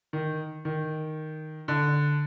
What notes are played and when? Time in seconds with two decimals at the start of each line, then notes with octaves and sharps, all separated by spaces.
0.13 D#3
0.65 D#3
1.68 D3